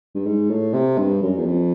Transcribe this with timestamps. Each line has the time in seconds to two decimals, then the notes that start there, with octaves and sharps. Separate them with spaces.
0.15 G2
0.26 G#2
0.50 A2
0.73 C3
0.98 G2
1.22 F#2
1.38 E2
1.46 F2